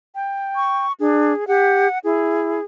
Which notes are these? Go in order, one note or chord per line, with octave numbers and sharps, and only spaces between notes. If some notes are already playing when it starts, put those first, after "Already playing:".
G5
C#6
D4 G#4
G4 F#5
E4 G#4